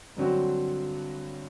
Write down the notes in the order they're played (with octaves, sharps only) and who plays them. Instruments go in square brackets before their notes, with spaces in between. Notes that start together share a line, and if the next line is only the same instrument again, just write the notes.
[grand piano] G2 D3 F#3 C4 F#4